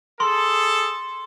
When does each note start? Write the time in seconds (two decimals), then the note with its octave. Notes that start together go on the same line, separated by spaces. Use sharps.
0.20 G#4 A4 C6